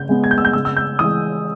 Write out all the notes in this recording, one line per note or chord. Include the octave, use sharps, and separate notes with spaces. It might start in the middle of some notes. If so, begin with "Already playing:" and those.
Already playing: C#3 G6
G#3 B3
G#6
G6
E6
G6
C#3 E6
E6
G6
E3 G#3 D#6